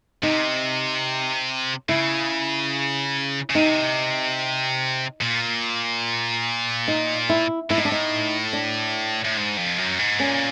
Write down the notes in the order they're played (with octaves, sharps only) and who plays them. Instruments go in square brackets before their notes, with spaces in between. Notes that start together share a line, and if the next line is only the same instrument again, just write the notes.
[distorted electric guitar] C3 [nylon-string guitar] D#4
[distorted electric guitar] C#3 [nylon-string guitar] E4
[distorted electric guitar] C#3
[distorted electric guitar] C3 [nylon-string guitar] D#4
[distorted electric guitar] A#2
[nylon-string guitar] D#4
E4
[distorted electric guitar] A2 [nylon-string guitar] E4
[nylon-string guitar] D#4
D4
D#4
D4
[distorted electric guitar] A2
G#2
F2
F#2
G#2
[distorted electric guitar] A#2 [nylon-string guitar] C#4